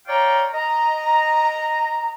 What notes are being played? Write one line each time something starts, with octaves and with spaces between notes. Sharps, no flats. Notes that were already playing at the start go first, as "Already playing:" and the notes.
C#5 D5 F5 G5 A#5
D#5 A#5